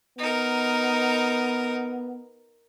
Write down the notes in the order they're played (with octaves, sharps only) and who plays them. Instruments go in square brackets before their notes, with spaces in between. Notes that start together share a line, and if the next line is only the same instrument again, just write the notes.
[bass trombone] B3 [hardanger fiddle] D#4 A#4